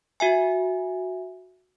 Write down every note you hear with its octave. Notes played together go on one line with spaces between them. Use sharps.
F#4 E5 G#5